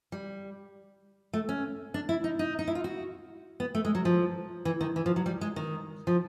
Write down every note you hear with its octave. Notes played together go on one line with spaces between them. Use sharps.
G3
A3
C#4
D4
E4
D#4
D#4
D#4
E4
F4
F#4
B3
A3
G#3
F#3
F3
E3
D#3
E3
F3
F#3
G3
G#3
D#3
F3